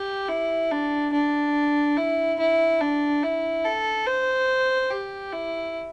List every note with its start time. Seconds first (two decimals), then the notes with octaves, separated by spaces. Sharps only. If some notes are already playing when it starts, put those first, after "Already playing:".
Already playing: G4
0.29 E4
0.71 D4
1.13 D4
1.97 E4
2.39 E4
2.80 D4
3.23 E4
3.65 A4
4.06 C5
4.90 G4
5.32 E4